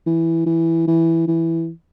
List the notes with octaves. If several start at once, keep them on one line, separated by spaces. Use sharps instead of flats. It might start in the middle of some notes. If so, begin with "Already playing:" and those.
E3
E3
E3
E3